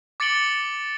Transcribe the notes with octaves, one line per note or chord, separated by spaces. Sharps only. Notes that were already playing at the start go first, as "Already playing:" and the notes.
D6 A6 C#7 D7 F#7 G7